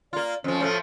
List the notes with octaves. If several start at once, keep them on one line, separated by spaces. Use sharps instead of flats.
A#3 F4 D5
F2 F3 C#4
A2 F3 A3